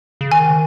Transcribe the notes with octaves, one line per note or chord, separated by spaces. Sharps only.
C#3
D#3 G#5